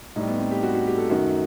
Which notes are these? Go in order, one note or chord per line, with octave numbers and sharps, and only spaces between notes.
A2 G3 D#4
B3
C4
G4
F#4
F#4
G4
A4
F#2 D#3 A3 F#4